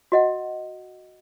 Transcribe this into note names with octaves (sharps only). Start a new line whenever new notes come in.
F#4 D#5 F#5